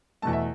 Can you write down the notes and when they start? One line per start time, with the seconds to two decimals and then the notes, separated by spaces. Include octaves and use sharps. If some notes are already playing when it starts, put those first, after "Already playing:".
0.22 E2 B2 A3 A5
0.33 E5